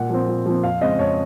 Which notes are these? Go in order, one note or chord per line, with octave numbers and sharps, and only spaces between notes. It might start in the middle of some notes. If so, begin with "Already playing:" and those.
Already playing: A#2 F#5
F3 C4
A#2
F3 C4
F2 F5
C#3 G#3 C4 D#5
F2 C#5